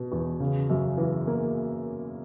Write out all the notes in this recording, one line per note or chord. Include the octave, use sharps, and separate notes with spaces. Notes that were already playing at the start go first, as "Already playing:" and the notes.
Already playing: B2
E2
C#3
F#2
E3
A#3